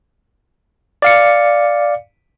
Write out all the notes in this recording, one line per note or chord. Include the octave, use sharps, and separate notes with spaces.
D5 F5 C#7